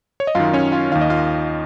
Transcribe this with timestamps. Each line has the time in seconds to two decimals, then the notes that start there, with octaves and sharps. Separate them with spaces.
0.20 C#5
0.27 D#5
0.35 F#2 D#3 F4 F5
0.53 C#4 C#5
0.72 F4 F5
0.91 D#2 D#3 F5
1.01 D#5
1.10 F4 F5